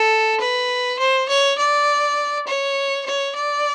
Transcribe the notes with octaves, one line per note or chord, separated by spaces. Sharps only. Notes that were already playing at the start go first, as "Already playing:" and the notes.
Already playing: A4
B4
C5
C#5
D5
C#5
C#5
D5